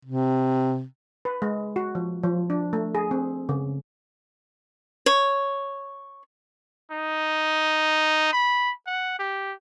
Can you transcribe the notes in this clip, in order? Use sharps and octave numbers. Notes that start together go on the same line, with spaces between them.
C3
B4
G#3
F#4
F3
F3
D4
A3
G#4
C4
C#3
C#5
D#4
B5
F#5
G4